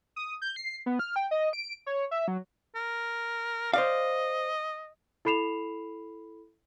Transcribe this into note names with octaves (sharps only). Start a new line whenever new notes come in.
D#6
G6
C7
B3
F6
G5
D#5
D7
C#5
E5
F#3
A#4
C5 D5 D#5 F5
E4 A4 B5 C7 E7 F7